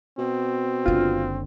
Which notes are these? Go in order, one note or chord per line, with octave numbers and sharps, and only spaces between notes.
B2 C4
F#1 D3 F4